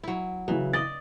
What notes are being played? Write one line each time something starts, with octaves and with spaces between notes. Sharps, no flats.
F#3 E4
C#3 E3 F#3
D5 D#5 A6